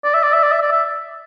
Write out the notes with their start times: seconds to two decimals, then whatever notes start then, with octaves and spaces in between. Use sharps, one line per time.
0.04 D5
0.14 E5
0.23 D5
0.33 E5
0.43 D5
0.52 E5
0.62 D5
0.72 E5